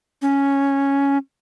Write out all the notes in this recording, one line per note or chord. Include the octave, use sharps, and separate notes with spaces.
C#4